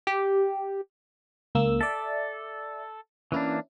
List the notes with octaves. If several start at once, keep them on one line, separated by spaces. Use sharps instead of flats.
G4
C#2 A#3 E6
A4 D5 E5
E3 A#3 C#4 D4 E4